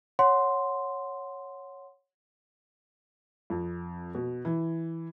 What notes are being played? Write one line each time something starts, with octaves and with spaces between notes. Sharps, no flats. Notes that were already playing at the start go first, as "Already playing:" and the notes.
C#5 F#5 C6
F2
B2
E3